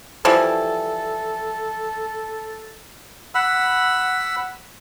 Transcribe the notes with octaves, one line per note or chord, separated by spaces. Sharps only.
E3 F3 G3 A4
F#5 B5 E6